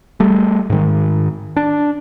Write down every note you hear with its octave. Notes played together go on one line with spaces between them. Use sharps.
G3 A3
G#2 D#3
D4